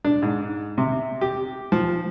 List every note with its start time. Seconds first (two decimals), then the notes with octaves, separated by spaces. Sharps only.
0.04 D4
0.22 G#2
0.78 C3
1.21 G4
1.72 F3